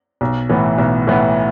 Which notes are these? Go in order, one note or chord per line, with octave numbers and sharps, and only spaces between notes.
B1
A2 E3 B3
B1
A2 E3 B3